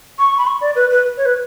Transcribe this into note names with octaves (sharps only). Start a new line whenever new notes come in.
C#6
B5
C#6
D5
B4
B4
C#5
B4